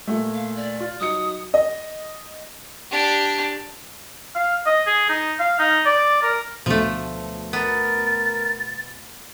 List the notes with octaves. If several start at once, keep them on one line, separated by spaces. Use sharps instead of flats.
A#2 A3
F5
D5
F4
F#3 D#4 D#6 C#7
D#5
D4 G4
F5
D#5
G#4
D#4
F5
D#4
D5
A#4
D2 B2 F3 A3
B3 A#4 A6